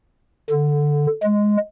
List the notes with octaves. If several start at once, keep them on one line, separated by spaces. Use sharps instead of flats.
D3
G#3